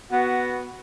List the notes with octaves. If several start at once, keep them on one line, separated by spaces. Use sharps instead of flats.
B3 F#4